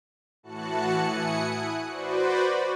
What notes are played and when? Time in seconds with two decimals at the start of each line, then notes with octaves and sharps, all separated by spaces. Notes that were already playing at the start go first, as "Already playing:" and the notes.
0.43 A2 E3 F#4 A5 F#6 C#7
0.97 E4 G#5 D#6 C#7
1.46 F#6 D#7
1.86 F#4 B4 C5 D5